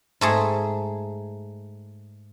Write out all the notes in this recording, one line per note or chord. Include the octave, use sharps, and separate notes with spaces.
G#2 A3 G#4